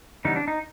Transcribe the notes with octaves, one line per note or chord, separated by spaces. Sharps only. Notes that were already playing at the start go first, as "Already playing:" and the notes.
C#3 E3 G3 B3 D#4
D4
D#4